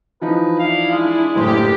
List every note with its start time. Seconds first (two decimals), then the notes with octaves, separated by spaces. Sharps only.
0.22 E3 F3 D#4 B4
0.59 D4 E4 F5
0.92 G#3
1.36 F#1 A2 G4 C6